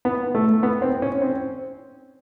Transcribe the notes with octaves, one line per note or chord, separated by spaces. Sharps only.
B3
A3
B3
C4
C#4
C4